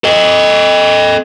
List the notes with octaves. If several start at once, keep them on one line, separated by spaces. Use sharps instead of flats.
A4 D#5